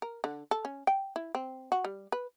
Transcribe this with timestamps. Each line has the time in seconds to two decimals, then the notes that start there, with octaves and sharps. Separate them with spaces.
0.02 A#4
0.24 D3
0.51 A4
0.65 C#4
0.87 G5
1.16 E4
1.35 C4
1.72 F#4
1.85 G3
2.12 B4